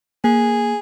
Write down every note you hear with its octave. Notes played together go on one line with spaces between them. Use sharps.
A#3 G#4